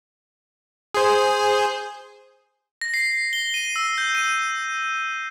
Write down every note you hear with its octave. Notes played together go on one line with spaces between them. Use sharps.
G#4 C5
A#6
C7
G7
D#7
E6
G6
D#7